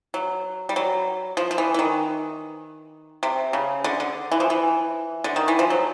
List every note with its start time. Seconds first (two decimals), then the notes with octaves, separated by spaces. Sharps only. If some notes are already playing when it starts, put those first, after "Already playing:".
0.14 F#3
0.69 G3
0.76 F#3
1.37 F3
1.51 F3
1.58 E3
1.74 E3
1.79 D#3
3.23 C3
3.53 C#3
3.84 D3
4.00 D3
4.32 E3
4.40 F3
4.50 E3
5.24 D3
5.36 D#3
5.48 E3
5.59 F3
5.70 F#3